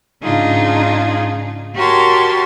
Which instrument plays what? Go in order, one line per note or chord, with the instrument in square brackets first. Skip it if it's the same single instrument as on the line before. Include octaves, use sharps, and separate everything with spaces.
[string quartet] G#2 C#3 D4 D#4 F4 G#4
F#4 G4 A#4 C#5 A5 C6